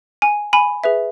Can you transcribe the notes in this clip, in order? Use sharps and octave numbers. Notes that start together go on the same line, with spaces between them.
G#5
G#5 B5
G#4 B4 E5